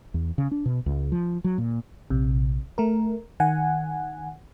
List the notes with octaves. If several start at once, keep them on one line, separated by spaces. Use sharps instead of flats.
E2
C#3
D4
B2
C#2
F3
F#3
A#2
A#1 C3
A3 A#4
D#3 F#5 G#5